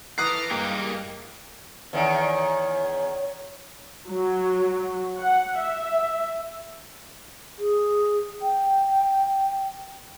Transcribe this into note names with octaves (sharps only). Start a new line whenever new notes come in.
E3 A4 A#5 D6 D#6 F6 F#6 C7
G2 G#3 A#3 G4
E2 D#3 C#5
F#3
F#5
E5
G#4
G5